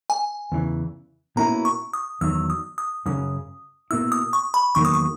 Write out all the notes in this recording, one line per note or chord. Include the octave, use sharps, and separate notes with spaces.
G#5
E2 C#3 E3
B2 A#3 C#4 E4 A#5
C#6
D#6
E2 D#3 F#3 E6
D#6
D#6
F#2 C#3 F#3 C#4 D#6
B2 A#3 E4 E6
D#6
C#6
B5
E2 D#3 F#3 A#3 C#6
D#6
C#6